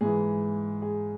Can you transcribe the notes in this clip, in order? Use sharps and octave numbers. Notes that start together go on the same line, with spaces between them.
G#2 E3 G#4
G#4